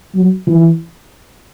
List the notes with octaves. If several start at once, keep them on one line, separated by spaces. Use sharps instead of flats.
F#3
E3